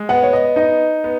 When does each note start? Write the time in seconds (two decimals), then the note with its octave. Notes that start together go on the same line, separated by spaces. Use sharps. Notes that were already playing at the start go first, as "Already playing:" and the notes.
Already playing: G#3
0.09 B3 F#5
0.23 C#5
0.33 D#5
0.56 D#4 D#5
1.04 B3